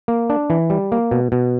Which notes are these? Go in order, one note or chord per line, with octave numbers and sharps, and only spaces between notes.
A#3
D4
E3
G3
A#3
B2
B2